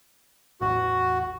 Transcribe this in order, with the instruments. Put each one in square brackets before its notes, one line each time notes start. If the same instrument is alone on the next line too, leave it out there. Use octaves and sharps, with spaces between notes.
[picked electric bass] A1 E2 [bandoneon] F#4